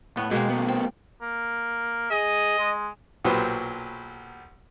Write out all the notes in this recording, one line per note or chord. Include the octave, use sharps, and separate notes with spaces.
A2 B3
B2 G#3 A#3 C4
A3 B3
C4
A#3
G#4 D#5
G#3
B1 A#2 F#3 G4 B4 C5